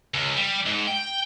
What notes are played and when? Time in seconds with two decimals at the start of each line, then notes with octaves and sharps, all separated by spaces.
0.14 C#2
0.36 G3
0.66 G#2
0.87 G5